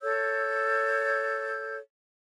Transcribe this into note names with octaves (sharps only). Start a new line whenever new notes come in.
A4 C#5 E6 G6